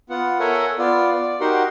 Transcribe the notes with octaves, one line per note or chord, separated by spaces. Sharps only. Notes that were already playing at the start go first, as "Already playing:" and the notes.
B3 F4 F#5
A4 A#4 C#5 E5 F#5 G#5
B3 F4 D5
D5
D#4 F#4 G4 A#4 F#5 C6